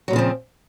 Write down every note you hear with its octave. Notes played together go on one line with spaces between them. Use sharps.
A#2 C#3 F3 F#3 C4